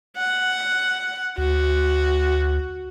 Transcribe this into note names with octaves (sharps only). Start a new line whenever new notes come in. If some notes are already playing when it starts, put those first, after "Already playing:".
F#5
D2 F#4